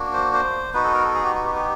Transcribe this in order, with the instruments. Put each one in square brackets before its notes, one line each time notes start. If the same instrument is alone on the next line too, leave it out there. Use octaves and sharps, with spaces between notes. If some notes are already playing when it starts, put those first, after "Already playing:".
Already playing: [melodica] A#3 D4 F#4
C5
C5
B3 D#4 F#4 B4
A4
A#4
A4
G#4
G4
F#4
G4
G4